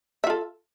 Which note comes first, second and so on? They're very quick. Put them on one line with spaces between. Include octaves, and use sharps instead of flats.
E5 F4 A4